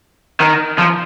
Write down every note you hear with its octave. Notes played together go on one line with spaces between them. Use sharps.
D#3
F3